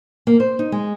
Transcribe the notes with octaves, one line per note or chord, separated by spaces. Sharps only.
A#3
C5
D#4
G#3